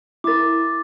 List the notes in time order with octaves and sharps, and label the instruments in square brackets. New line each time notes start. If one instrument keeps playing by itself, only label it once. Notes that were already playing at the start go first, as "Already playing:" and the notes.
[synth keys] E4 A#4 [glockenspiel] D6 A6